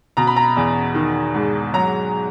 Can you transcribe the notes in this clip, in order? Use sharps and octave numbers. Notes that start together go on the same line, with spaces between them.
B2 A#5
B5
A#5
E2
D#3
G#2
F#3 A#5